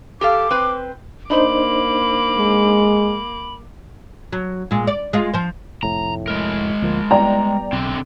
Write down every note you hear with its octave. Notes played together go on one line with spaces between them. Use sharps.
G4 A4 F5 D6
C4 B4 C5
A#3 D4 D#4 C5 B5 D6
G#3
F#3
A#2 G#3
D5
G#3 F4
F3 C5
F1 A2 A#5
G#3 A#4
D2 F3 A#3
G3 B3 D5 G5 A#5
B1 D3 C4